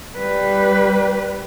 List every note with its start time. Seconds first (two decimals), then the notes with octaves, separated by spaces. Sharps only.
0.18 G3 B4